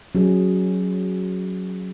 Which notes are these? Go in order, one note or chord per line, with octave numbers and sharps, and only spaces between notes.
F#3 C#4 G#4